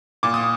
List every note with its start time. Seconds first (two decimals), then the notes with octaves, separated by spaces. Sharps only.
0.23 A#2 D6
0.34 D#6